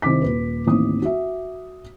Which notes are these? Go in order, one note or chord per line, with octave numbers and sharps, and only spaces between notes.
C2 D#3 C5 D6 B6
D#1 B4
A1 D#2 C4 D#4 D#6
F#4 E5